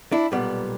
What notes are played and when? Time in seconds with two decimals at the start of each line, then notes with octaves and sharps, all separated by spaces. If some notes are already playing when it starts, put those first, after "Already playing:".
0.12 D4 E4
0.32 B1 A#2 G3 B3